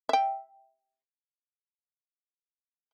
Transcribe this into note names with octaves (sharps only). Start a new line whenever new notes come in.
E5 G5